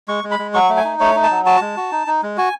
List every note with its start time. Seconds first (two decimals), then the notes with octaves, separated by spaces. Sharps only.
0.08 G#3 C#6
0.24 G#3
0.31 B5
0.39 G#3
0.54 F#3 C#6
0.69 A3
0.77 G#5
0.84 D#4
1.00 A3 C#5
1.16 D#4
1.23 A5
1.31 F#3
1.46 F#4 A5
1.61 G#3
1.77 F#4
1.92 D#4
2.07 D#4
2.23 G#3
2.37 F#4 G#5